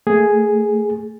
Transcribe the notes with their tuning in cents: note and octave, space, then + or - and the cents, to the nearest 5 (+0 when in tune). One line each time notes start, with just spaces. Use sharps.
A3 +25 G#4 +0